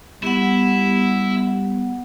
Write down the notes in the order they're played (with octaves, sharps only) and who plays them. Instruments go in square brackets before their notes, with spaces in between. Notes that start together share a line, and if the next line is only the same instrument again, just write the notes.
[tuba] G3 [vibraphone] B3 F#5 [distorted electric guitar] E4